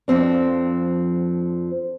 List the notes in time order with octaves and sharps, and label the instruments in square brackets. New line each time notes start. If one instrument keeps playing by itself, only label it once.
[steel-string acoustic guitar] F2 F3 C4 D4